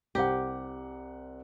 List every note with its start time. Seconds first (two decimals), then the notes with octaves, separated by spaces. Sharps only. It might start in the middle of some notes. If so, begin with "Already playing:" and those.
0.15 C2 G4 C5 F#5